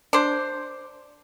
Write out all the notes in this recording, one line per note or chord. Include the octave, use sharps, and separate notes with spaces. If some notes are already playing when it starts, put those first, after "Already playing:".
D4 C5